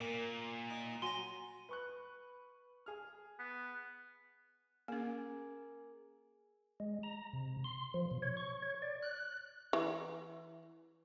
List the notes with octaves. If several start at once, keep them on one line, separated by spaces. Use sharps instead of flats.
A#2 A#3
D#4
F#3 G#5 A#5 C6
B4 C#6 F#6
G#4 F6
B3
A#3 C#4 G#4 A#4 G#5
G#3
A#5
C3
C6
F3
B2
C#5
C#6
C#5
D5
F#6
E3